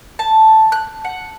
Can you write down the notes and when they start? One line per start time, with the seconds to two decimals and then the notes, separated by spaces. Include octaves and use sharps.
0.19 A5
0.72 F#6
1.05 F#5